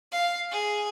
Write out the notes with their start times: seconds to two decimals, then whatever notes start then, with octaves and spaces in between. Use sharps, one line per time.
0.12 F5
0.51 G#4